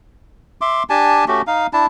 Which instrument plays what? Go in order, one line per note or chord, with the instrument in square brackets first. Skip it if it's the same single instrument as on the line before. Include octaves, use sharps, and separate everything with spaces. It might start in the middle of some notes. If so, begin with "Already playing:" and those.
[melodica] E5 C6 D6
D4 G4 G#5 A5
A3 C#4 F#4 G4
D#4 F5
D4 E4 A5